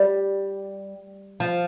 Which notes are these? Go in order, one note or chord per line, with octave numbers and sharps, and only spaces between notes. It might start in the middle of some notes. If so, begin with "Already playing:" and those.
Already playing: G3
F3